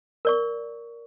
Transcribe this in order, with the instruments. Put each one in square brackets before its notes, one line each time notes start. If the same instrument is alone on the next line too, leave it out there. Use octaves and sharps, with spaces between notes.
[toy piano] A#4 D5 C#6